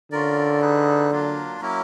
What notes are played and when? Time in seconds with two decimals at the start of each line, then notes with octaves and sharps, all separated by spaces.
0.12 D3 C#4 F4 A#4 D5
0.61 D#4 G#4 B4
1.11 F#3 A#3 D4 F4
1.60 F#3 A#3 C#4 E4